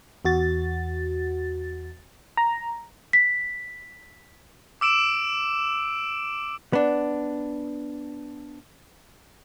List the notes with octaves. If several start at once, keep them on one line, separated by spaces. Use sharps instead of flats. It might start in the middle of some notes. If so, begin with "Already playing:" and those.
E2 F#4 A6
A#5
B6
D6 E6 D7 E7
B3 D4